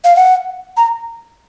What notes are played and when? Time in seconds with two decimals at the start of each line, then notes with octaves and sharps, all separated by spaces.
0.04 F5
0.16 F#5
0.77 A#5